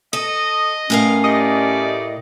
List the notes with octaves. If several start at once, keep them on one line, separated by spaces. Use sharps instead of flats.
A4 D#5
A2 C#4 A#4 F5
G3 A3 D5 D#5